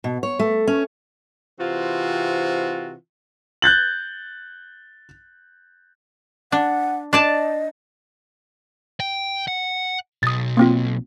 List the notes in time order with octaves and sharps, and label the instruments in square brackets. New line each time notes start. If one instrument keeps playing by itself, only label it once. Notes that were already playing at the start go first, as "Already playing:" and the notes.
[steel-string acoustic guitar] B2
C#5
A3
C#4
[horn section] C3 E3 C4 F4 F#4
[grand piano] F#6 G6 A6 F#7
[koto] D4 [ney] F#5
[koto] D4 D5 A5 [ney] D#5
[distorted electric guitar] G5
F#5
[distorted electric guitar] B1 [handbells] D#6 A6
[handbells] A#3 C4 F4